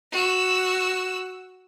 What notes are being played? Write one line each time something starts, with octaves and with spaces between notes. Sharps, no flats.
F#4 E6